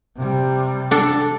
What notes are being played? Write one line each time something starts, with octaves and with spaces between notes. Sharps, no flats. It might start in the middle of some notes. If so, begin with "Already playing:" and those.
C3 G3
D4 A4